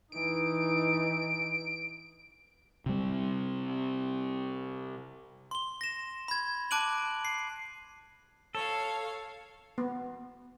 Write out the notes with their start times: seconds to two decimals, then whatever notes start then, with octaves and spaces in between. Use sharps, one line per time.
0.12 E3 D#4 D7
2.86 C3 G3
5.51 C6 G7
5.81 A#6 E7
6.28 B5 G#6
6.71 A5 D6 F#6 D7 D#7 F#7
7.25 C7
8.55 A4 C#5 F5
9.78 B3